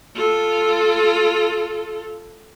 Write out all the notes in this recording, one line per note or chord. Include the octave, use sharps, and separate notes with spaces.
F4 A4